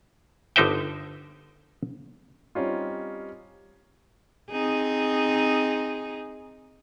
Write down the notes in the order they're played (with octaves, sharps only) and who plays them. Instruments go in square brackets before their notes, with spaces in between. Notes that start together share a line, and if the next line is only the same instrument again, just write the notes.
[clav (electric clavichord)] G1 D3 D#4 C5 E5 G5
[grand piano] G3 C4 C#4 D#4 F4
[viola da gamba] C4 D#4 G#4